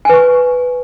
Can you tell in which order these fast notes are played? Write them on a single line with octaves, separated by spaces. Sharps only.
G#5 B4 C#6